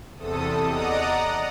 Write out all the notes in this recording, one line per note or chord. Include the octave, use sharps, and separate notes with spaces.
E2 C3 A4 D#6
D5 D#5 F#5 A#5 D#6